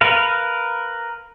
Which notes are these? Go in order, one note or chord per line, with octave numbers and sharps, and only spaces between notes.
A#4 B4 F5